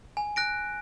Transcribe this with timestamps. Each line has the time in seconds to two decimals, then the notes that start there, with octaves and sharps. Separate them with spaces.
0.17 G#5
0.36 F#6 A#6 D7